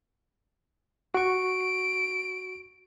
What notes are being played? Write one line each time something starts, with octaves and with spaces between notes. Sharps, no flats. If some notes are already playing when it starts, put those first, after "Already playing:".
F#4 C#6 D7